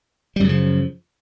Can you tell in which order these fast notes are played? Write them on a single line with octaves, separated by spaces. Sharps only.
G3 F#2 C#3 F3